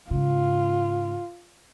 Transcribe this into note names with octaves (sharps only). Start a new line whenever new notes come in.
G#2 C#3 F4